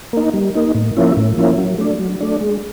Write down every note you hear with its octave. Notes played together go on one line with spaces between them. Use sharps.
A#3 D#4
G3
A#3 D#4
A2
F3 A#3 C#4 E4
A2
F3 A#3 C#4 E4
F#3
A3 D4
F#3
A3 D4
G#3